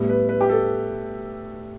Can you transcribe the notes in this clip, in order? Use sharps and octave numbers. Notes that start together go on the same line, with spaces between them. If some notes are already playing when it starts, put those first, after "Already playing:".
Already playing: A2 G3 B3
B4
B4
G4
A4